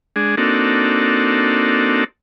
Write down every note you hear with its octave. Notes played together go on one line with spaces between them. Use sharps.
G#3 D4 G#4
A#3 C4 D4 D#4 F#4 A4